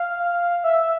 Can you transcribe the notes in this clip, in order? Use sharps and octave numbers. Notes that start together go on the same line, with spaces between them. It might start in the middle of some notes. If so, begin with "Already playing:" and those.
Already playing: F5
E5